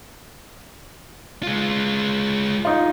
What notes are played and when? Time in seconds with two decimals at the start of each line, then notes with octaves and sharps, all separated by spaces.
1.43 G#3 F4
2.65 D#4 F4